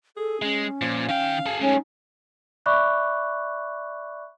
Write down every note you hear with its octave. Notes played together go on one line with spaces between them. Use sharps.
G#4 A4
G#3 C#4
A#2 F3
D#3 F5 G5
G#4 A4
G#3 A3 C#4 D#4
D5 E5 B5 C#6 D6 F#6